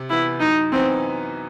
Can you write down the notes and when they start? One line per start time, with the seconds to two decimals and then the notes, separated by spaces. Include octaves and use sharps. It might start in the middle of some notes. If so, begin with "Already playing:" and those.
Already playing: C3
0.10 E3 B3 E4
0.40 F#2 D#4
0.72 E3 B3 C4 D#4